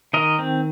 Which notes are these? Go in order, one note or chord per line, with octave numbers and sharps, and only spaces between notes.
D#3 A#4 D#5
C4